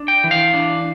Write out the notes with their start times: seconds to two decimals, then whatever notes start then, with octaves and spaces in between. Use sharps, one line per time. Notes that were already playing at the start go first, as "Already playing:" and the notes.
Already playing: D4
0.08 G5
0.24 E3
0.31 F5
0.54 D4